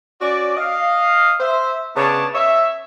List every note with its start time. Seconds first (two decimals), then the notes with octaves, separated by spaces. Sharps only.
0.21 C#4 F#4 D5
0.57 D#5 F5
1.40 C5 E5
1.96 C#3 B3 D4 C#5 A5
2.34 C#5 D#5 E5